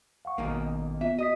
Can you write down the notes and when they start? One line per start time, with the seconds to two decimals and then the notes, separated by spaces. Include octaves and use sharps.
0.25 F5 F#5 C#6
0.38 A1 B2 D#3 A#3
1.01 B3 F4 E5
1.19 F#4 D#5 D#6 B6